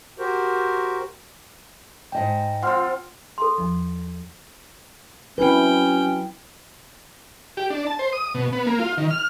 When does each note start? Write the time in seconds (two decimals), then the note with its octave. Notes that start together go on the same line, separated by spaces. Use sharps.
0.19 F#4 G4 A#4 C5
2.12 G#2 D#5 G5 A5
2.63 F3 C4 F4 F#5 C6 F6
3.38 A4 C6
3.58 E2 F3
5.38 F#3 C4 C#4 E4 B4 G5
7.57 G4
7.70 D4
7.87 A5
7.99 C5
8.13 D#6
8.35 B2
8.53 B3
8.67 A#3
8.79 F4
8.98 D#3
9.11 F6